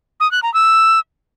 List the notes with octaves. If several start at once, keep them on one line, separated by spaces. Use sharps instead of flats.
D#6
F#6
A#5
E6